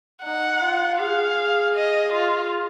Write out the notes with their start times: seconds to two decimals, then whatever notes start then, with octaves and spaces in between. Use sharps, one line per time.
0.23 D#4 F#5
0.61 F4
0.99 G#4 F5
1.75 D#5
2.13 F4